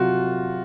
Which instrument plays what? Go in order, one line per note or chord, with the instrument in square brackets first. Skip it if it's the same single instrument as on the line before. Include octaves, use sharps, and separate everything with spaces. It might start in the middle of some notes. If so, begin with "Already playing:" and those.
Already playing: [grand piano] C3 F#3 F4 F#4